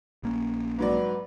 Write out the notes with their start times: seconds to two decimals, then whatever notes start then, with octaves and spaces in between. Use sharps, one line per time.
0.23 A#1 A#3 C#4
0.79 G#2 F#3 B4 D5